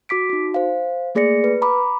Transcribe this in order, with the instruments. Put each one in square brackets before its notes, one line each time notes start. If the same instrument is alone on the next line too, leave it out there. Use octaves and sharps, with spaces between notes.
[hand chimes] F#4 D6 B6 D7
D#4 F#4
C5 F5
A3 A#3 G#4 D5 A#6 C#7
B4
A#5 B5 D6